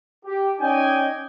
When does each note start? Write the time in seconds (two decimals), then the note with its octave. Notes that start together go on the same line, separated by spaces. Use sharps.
0.25 G4
0.60 C#4 D#4 D5 D#5 G5 G#5